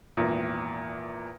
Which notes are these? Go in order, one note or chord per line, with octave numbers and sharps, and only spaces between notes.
G#1 E2 A#2